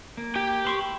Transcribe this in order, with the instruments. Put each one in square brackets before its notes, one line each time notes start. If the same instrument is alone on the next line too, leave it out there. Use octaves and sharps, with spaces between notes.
[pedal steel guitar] A#3
[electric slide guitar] G4 G5
[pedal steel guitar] B4 C6 C#6
E4 B5